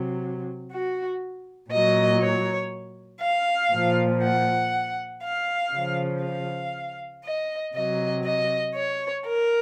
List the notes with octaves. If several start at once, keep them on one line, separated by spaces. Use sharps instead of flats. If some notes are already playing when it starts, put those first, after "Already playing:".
Already playing: C3 F#3
F#4
A#2 F#3 D#5
C#5
F5
A#2 F3
F#5
F5
C#3 F3
F5
D#5
C3 F#3 D#5
D#5
C#5
A#4